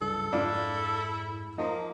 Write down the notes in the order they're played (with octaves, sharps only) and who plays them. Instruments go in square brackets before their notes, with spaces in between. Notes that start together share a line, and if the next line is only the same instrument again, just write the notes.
[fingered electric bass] F#1 C#2 G2 [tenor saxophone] A4
[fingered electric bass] F2 G#2 G#3 [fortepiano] D4 F4 [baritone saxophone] E4
[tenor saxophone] F3 [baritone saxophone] A#3 [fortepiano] D#4